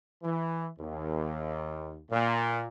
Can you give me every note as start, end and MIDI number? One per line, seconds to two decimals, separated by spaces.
0.23 0.68 52
0.79 2.00 39
2.11 2.67 46